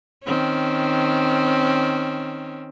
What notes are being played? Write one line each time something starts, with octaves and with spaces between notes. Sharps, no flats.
D#3 C4 C#4